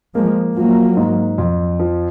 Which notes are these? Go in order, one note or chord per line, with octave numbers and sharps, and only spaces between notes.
F3 G#3 A#3
F3 F#3 A#3
G#2
F2
F3